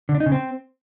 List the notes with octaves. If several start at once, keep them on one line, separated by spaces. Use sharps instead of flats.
D3
D4
D#4
C#3
C4